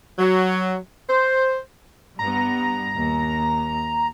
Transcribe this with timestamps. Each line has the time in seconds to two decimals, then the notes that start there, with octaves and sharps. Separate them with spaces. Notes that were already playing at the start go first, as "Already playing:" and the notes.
0.19 F#3
1.09 C5
2.19 G2 B3 A#5
2.95 D#2